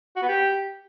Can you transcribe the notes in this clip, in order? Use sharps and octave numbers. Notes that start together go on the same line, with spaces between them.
F#4
B3
G4